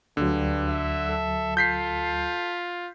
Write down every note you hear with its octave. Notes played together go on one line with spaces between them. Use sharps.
D2 G2 D3 F#3
E5
A4
F4 G6 B6 C7